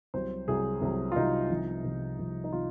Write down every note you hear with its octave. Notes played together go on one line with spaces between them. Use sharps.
C2 C3 F#3 C5
C2 C3 F#3 G#4
C2 C3 F#3
F4
C2 C3 F#3 D#4
C2 C3 F3
C2 C3 F3
C2 C3 F3
D#4
C3 F3 F4